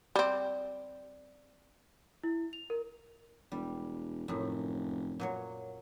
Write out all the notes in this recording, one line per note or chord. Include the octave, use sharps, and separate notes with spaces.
G3 C4
E4
F7
A#4
E1 G3
F1 F#2 A2
A#2 F#3 C#5